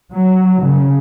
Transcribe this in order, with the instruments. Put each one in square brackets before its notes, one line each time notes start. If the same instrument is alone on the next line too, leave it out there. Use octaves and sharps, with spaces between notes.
[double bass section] F#3
C#3